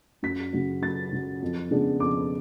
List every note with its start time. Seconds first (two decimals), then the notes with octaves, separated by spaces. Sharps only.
0.23 F#2 B6
0.53 C#3 F#3
0.82 F#2 A6
1.12 C#3 F#3
1.42 F2
1.71 C#3 G#3 B3 D4
2.00 F2 D6